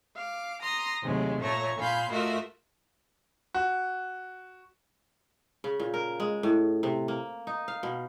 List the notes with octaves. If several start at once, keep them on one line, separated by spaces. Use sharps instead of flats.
F5 D6
A#5 C6 D#6
D#2 C3 F#3 G#3 A3
A#2 A3 C#5 A#5 C#6
A#2 F5 G#5 B5 C6 G6
A3 F4 F#4 A#4 D#5 E5
F#4
C#3
A#2
A#4
G#3
A2
C3
A#3
D#4
F5
B2